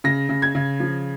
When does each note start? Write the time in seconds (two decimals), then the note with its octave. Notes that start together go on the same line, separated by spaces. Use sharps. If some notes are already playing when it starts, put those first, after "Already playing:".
0.04 C#3 A#6
0.29 C#3
0.42 G#6
0.55 C#3
0.80 F3